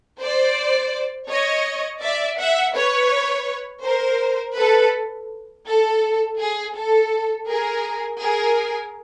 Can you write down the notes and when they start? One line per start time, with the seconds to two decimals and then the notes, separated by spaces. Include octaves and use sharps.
0.22 C5 D5
1.31 C#5 D#5
2.03 D5 E5
2.39 E5 F#5
2.75 B4 C#5
3.85 A#4 C5
4.58 A4 B4
5.67 A4
6.40 G#4
6.76 A4
7.48 G#4 A#4
8.22 G#4 A#4